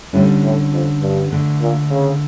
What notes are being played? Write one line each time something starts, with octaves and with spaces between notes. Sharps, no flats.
A2 D3 G3 C#4
A2
F2
G2
D3 A3 D4
A#2
C#3